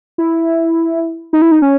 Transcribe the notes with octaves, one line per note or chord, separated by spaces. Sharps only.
E4
D#4
E4
D#4
C#4